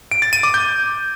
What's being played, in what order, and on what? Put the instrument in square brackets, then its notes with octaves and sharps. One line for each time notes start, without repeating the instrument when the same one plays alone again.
[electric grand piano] D7
A6
D#7
D6
G6